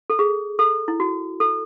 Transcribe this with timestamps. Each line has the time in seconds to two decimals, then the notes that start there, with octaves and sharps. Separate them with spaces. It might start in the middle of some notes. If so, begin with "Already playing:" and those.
0.10 A4
0.19 G#4
0.59 A4
0.88 E4
1.00 F#4
1.40 A4